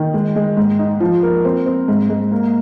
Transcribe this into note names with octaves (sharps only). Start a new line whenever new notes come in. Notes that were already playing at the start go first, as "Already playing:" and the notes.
Already playing: D#3
G#3
G#3
G#2
D#4
F3
A#4
C4
C4
G#2
G#2
A#3